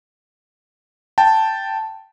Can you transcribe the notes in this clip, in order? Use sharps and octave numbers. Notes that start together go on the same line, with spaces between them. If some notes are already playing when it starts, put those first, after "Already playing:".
G5 A5